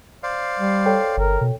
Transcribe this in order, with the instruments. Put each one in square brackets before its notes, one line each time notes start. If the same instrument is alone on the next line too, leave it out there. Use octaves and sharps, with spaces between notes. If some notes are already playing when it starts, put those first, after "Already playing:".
[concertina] C5 D5 F5
[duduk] G3
[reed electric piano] A4 C#5 G5
[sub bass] G1 [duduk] A#4
[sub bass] B2